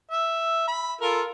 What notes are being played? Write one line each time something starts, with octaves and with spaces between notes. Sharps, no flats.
E5
B5
F4 A4 A#4